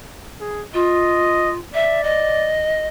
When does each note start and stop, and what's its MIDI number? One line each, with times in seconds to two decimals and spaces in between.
0.41 0.64 68
0.74 1.58 65
0.74 1.52 75
1.74 2.54 74
1.74 2.03 76
2.03 2.88 75